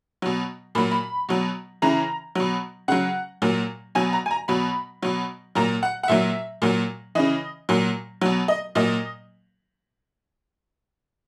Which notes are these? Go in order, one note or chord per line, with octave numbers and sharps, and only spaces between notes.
B2 F#3
A#2 F#3 B5
B5
B2 F#3
C#3 E3 A#5
B2 F#3
C#3 F#3 F#5
A#2 F#3
B2 F#3 G#5
A#5
G#5
A#5
B2 F#3 B5
B2 F#3
A#2 F#3 A#5
F#5
F#5
A#2 F#3 E5
A#2 F#3
C#3 E3 D#5
A#2 F#3
B2 F#3
D#5
A#2 F#3 D#5